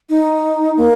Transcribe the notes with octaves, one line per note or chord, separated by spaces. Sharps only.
D#4
A#3